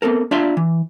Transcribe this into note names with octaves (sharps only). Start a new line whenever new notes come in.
B3 C4 A4 A#4
D4 F4 D5 E5 F5 C6
E3